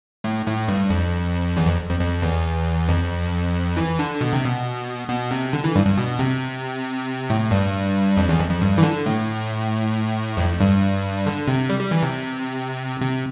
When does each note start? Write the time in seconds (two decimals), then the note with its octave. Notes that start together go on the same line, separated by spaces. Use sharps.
0.24 A2
0.46 A2
0.68 G2
0.90 F2
1.57 E2
1.67 F2
1.90 F2
2.00 F2
2.22 E2
2.89 F2
3.77 E3
3.99 D3
4.21 B2
4.33 C3
4.45 B2
5.09 B2
5.31 C3
5.53 D3
5.64 E3
5.76 G2
5.86 G2
5.97 B2
6.19 C3
7.30 A2
7.51 G2
8.17 F2
8.29 E2
8.39 F2
8.51 F2
8.61 G2
8.78 E3
8.83 D3
9.06 A2
10.37 F2
10.60 G2
11.26 D3
11.48 C3
11.70 G3
11.80 G3
11.91 E3
12.02 C3
13.02 C3